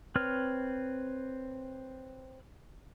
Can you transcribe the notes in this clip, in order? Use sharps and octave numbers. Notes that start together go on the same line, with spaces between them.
C4 B4 C#5 F6